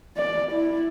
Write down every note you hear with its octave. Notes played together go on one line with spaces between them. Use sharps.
D5
E4